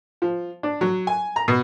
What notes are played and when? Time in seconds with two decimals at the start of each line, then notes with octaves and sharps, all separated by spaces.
0.22 F3
0.63 D4
0.81 F#3
1.07 G#5
1.36 A#5
1.48 B2